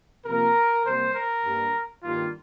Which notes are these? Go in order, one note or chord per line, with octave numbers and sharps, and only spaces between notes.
C3 F3 A#3 A#4
C3 G3 A#3 C5
A#4
G2 G3 A#3
G2 D#3 G3 A#3 F4